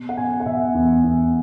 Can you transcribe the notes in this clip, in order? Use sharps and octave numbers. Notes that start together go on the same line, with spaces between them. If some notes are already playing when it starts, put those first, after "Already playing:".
Already playing: B2
F#5
B2 G#5
F#5
B2 E5
E2
E2